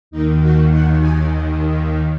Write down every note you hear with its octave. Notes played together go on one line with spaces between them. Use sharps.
D#2 D#3 D#4
F#4
F#5
G#5